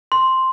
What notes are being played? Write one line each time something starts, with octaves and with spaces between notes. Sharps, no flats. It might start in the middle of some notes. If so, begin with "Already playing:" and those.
C6